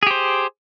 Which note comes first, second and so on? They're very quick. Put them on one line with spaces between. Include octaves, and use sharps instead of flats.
G#4 G4 C5